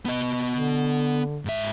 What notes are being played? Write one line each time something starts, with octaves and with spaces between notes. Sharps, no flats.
B3 D#5
D3
G#2 E5